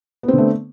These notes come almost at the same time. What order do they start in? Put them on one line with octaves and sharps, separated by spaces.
B3 C4 D3 A3